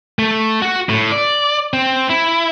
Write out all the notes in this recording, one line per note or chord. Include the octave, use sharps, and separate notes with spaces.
A3
F#4
A2
D5
C4
E4